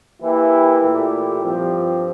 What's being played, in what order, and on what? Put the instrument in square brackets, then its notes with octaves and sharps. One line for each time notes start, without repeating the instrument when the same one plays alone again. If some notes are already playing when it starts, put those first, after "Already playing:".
[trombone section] E3 A#3 E4 G4
A#2 A3 E4 G4
G2 F3 C4 G4